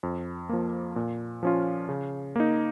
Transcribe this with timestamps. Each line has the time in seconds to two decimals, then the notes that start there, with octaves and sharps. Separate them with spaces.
0.03 F2
0.49 F3 A#3
0.96 A#2
1.43 F3 C#4 F4
1.89 C#3
2.36 A#3 D#4